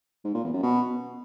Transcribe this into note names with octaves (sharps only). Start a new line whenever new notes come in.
G#2
A#2
E2
F#2
B2